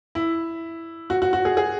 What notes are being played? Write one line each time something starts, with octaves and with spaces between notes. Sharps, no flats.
E4
F#4
F#4
F#4
G#4
G#4